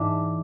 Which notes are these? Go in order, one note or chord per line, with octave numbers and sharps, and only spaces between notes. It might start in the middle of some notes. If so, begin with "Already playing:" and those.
Already playing: G#2 E3 D4 E4